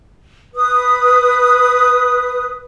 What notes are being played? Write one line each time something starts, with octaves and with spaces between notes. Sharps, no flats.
B4 D#6